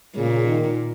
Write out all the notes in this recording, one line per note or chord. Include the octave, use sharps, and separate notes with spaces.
A#2 C#3
D#3